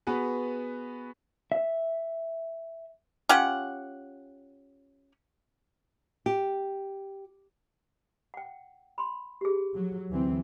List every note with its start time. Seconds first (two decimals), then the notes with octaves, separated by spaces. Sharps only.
0.07 B3 F#4 G#4 B4
1.52 E5
3.29 C#4 F4 G4 F#5
6.26 G4
8.34 F#5 G5
8.98 B5 C6
9.41 G4 G#4
9.75 F#3
10.09 D2 E3 C4